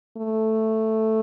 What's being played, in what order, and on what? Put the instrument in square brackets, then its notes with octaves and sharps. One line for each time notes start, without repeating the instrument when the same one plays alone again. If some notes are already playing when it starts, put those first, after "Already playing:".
[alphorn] A3